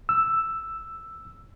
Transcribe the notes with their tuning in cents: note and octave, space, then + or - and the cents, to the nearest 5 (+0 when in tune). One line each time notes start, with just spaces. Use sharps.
E6 +5